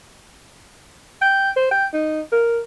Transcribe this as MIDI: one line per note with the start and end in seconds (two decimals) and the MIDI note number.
1.22 1.50 79
1.56 1.70 72
1.71 1.86 79
1.93 2.21 63
2.32 2.60 70